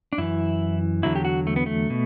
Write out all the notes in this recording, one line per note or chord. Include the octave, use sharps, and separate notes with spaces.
D4
F#2 E3 E4
E2 D3 F#3 E4
G4
F#4
A3
B3
A3
B2